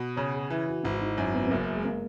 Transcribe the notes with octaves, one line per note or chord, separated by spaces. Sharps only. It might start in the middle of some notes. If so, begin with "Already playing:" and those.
Already playing: B2
C#3 C#5
G#4
E3
F#4
G#1 E4
D#4
F#2 C#4
B3
B3
F#1 A#3
G#3
A#3